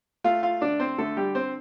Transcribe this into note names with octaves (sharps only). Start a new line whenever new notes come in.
A3 F4 F5
F4 F5
D3 D4 D5
C4 C5
D3 A3 A4
G3 G4
C4 C5